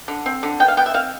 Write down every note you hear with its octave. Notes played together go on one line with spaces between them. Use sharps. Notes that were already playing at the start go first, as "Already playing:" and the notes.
D3
C4
D3
B3 G5
F5
B3 G5
E5
C4 F5